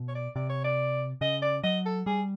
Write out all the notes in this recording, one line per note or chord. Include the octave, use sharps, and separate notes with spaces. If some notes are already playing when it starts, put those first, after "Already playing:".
Already playing: B2
C#5
D5
C3 D5
C#5
D5
C#3 D#5
D5
F#3 D#5
A4
G3 G#4